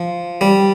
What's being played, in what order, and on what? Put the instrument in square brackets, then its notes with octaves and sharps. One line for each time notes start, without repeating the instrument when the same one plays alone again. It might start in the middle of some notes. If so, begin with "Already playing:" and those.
Already playing: [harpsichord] F3
G3